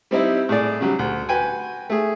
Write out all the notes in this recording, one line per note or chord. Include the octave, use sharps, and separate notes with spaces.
G3 C4 D#4 E4
A2 G#4 D5
C#3 F#3 G3
D2
F#4 B4 G5 G#5
A3 G#4